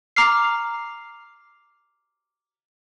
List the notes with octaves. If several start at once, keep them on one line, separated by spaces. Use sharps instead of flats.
A#5 D6 F6 C7